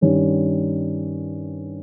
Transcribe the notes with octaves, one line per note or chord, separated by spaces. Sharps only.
G2 D#3 G3 C#4